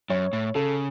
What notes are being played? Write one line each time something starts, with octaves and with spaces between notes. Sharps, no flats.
F#2 C#5
A2
C#3 A4